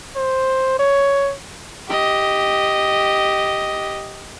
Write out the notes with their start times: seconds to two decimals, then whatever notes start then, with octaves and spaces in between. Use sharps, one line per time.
0.16 C5
0.79 C#5
1.88 G4 D#5